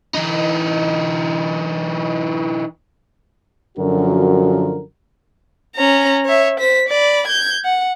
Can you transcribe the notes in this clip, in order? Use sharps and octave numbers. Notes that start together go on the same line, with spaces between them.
E3 D#4
F#2 D3 F3 F#4 A#4
C#4 A#5
C#5 E5
C5 B6
D5 B5
G6 G#6
F#5